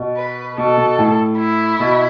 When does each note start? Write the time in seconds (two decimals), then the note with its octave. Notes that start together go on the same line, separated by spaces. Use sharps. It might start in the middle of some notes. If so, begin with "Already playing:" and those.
Already playing: B2
0.17 B4
0.58 B2 A4
0.78 B2
0.99 A2
1.38 E4
1.80 B2